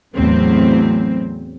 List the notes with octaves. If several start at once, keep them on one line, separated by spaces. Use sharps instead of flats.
E2 A2 F#3 C4